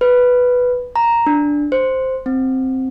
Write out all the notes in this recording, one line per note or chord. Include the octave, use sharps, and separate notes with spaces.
B4
A#5
D4
C5
C4